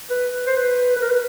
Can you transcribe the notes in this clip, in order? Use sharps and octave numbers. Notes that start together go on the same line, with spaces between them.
B4
C5
B4
B4
A#4
B4